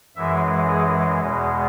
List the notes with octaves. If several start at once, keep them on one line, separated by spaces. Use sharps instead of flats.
F#2 E3 G#3 E5
G#4
E2 B2 G#3